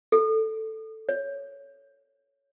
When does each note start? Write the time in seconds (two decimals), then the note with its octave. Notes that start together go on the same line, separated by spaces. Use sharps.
0.12 A4
1.09 C#5